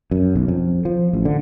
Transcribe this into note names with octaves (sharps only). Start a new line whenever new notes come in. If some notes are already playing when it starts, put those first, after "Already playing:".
F#2
B1
F2
F3
A1
D3